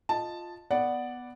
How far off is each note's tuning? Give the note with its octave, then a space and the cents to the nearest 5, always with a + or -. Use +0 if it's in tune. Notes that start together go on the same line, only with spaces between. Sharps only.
F4 +0 D#5 -10 A5 +0
B3 +0 D5 +0 F#5 +0